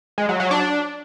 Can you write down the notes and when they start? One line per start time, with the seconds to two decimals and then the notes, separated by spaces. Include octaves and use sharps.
0.18 G#3
0.29 F#3
0.40 F#3
0.51 D4